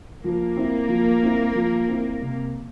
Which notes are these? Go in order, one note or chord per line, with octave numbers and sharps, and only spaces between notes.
F3 A#3
C4 E4
F3
C4 E4
F3
C4 E4
C3